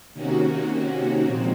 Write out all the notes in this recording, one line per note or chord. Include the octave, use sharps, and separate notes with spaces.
C3 D#3 A#3 C#4 F#4
A#2 F3 G#3 C4